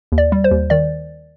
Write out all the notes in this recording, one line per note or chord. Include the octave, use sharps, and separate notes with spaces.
D#2
D5
G3
C5
D#2
D#3 D5